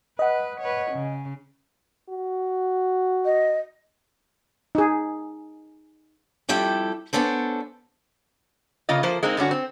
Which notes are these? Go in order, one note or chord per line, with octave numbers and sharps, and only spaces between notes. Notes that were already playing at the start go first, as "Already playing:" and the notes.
B4 D#5 F#5
B4 C#5
C#3
F#4
D#5
D#4 G#4
F2 G3 E4 G4 A4 G5
B3 C#4 D4 A4 C5
C#3 A#3 F4 D#5
F3 A#3 C5
G#3 A#3 C4 D#4
G2 D3 C#4 F#4
C4